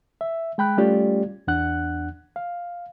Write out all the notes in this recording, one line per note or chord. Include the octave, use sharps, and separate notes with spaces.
E5
G#3 G5 B5 F#6
G3 A3 C#4 F4 G4 D5
E2 D4 F#5 F#6
F5